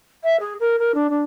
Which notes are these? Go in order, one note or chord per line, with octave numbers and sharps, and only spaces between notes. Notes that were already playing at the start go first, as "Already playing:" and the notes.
E5
G#4
A#4
A#4
D4
D4